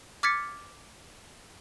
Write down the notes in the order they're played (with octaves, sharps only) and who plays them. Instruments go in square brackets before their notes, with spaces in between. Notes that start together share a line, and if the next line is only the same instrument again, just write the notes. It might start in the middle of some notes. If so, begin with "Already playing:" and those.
[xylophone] D6 F6 G#6 A6 B6 C#7